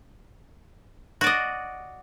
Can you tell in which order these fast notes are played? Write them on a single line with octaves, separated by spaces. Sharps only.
F#4 D5 D#5